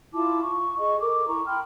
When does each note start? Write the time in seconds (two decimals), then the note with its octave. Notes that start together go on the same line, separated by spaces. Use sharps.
0.13 E4 F4 A5 D6
0.41 C#6
0.78 G#4 D#5 C#6
0.99 A4 A#4 D6
1.28 E4 A#5 C#6
1.46 G5 B5 C6 F6